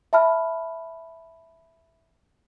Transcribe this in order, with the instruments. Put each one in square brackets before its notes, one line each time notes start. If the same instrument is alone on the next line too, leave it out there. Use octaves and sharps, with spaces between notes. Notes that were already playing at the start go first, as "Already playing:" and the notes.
[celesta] E5 A5 B5 F6